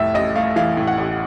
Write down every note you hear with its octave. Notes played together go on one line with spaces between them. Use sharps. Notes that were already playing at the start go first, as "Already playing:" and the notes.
Already playing: F1 A2 E5
A1 D#5
A3 F5
E3 F5
A2
F#5
A1